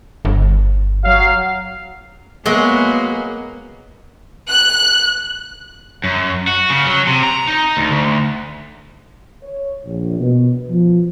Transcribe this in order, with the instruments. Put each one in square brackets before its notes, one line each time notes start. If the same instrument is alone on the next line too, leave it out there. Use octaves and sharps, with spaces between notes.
[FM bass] G1
[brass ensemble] F#3 F5
[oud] F#3 G#3 [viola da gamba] A#3 B3
[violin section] F#6
[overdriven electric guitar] F#2
F#4
C#3
F#3
C3
A#5
D#4
D2
D2
[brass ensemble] C#5
A#1
B2
F3